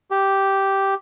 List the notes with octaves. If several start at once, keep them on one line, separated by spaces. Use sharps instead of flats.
G4